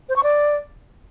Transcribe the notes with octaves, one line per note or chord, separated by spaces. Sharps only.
C5
C#6
D5